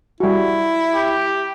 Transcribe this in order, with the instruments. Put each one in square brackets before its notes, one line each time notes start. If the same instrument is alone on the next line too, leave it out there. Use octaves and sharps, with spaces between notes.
[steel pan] G3 F#4 [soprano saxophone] E4
[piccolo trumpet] G4